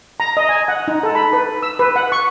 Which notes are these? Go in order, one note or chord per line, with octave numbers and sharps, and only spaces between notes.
A#5
D#5
G#5
F#5
D#4
A4
B5
B4
E6
B4
F#5
C#6